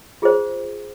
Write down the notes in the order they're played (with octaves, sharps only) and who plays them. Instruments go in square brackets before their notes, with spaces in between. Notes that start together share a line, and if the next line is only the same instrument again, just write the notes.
[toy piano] F4 G#4 C5